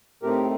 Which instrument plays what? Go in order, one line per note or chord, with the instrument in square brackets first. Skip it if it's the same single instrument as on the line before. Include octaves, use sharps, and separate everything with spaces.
[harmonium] A2 A3 C4 D#4 G4 A#4